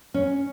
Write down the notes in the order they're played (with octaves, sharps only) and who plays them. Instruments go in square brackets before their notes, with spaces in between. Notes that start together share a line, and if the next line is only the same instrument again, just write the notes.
[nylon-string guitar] C#4